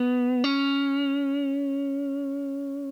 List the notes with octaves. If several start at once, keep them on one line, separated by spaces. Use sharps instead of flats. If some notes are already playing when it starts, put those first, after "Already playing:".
Already playing: B3
C#4